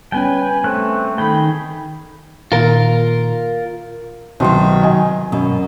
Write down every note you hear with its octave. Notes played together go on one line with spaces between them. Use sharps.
G3 B3 C#4 B4 G5 G#5
A3 C4 F#6
D#3 G#4 A4 G5 B5
A#2 D#3 A#3 F4 A#4
C2 B2 D#3 F#3 C6
D#5 G#5
F#2 B2